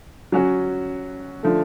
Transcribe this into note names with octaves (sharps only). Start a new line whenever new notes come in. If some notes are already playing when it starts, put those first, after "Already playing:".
F#3 C#4 F#4
D3 F3 A3